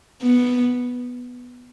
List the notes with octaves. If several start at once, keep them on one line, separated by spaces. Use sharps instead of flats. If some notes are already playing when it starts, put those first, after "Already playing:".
B3